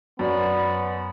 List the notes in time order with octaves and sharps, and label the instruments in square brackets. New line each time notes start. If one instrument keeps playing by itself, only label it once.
[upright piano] F#2 [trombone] B3 [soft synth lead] D5